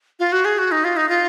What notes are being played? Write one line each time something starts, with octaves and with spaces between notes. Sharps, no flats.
F4
F#4
G#4
F#4
D#4
F4
D#4
F4